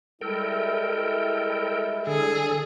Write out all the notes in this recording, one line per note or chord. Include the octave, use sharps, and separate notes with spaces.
G3 G#3 E4 A4 A#4 G5
D3 G#4 A4